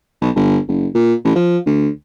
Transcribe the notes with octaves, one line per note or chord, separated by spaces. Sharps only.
B1
G1
F#1
A#2
A1
F3
D2